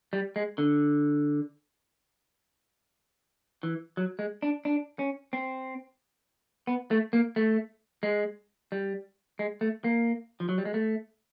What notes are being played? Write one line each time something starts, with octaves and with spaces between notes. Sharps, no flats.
G3
G#3
D3
E3
F#3
G#3
D4
D4
C#4
C4
B3
A3
A#3
A3
G#3
G3
G#3
A3
A#3
F3
F#3
G3
G#3
A3